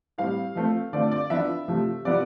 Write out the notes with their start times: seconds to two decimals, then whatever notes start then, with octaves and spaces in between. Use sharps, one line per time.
0.18 A2 G3 C4 F5
0.55 F3 A3 C4
0.93 D3 A3 C4 F4 D5
1.11 D5
1.30 F3 B3 D4 F4 E5
1.68 C3 F3 A3
2.05 C3 F3 B3 E4 D5